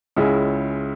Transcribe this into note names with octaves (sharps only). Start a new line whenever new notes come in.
C#2 C#3 G#3 C#4 E4